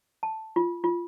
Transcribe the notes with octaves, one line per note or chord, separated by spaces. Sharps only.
A5
F4
F4